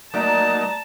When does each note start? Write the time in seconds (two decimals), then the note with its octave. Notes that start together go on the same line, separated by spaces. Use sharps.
0.14 F#3 A3 A#3 D#4 D5 E5 A5 A#5